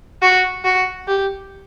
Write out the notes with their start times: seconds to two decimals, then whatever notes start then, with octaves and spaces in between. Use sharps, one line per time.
0.22 F#4
0.65 F#4
1.08 G4